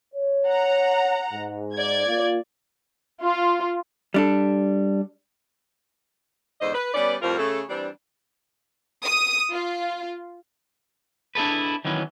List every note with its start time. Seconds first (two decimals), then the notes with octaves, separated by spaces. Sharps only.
0.14 C#5
0.47 F#5 A#5
1.33 G#2
1.75 D5 G#6
2.07 A#3 F4
3.23 F4
4.14 G3 D4 A4
6.61 E2 G#2 D3 C5 D#5
6.75 B4
6.94 G3 B3 C#4 B4 D5
7.22 F2 A2 F3 G3 F4 A#4
7.38 C#3 A3 A4
7.69 E3 G3 C4 D4
9.05 D#6
9.53 F4
11.35 D4 E4 G#4 A4 B4
11.85 D#3 E3 F#3 B3 C#4